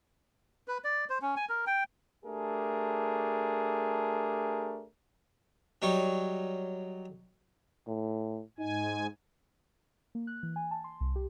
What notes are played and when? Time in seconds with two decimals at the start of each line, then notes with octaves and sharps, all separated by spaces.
0.68 B4
0.84 D5
1.10 C5
1.22 C#4
1.37 G#5
1.49 A#4
1.67 G5
2.24 A3 D4 G4 G#4 A#4
5.82 F#3 G3 D#4 C#5
7.87 A2
8.59 G#2 D#4 G#5
10.15 A#3
10.27 F#6
10.43 E3
10.56 G#5
10.71 A5
10.84 C6
11.00 C2
11.16 G4